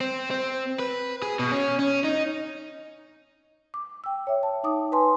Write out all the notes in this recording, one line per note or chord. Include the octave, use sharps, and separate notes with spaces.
C4
C4
B4
G#4
B2
C#4
C#4
D#4
D6
G5 E6
C#5 E5
A5
D#4 D6 D#6
B4 G#5 A5 C6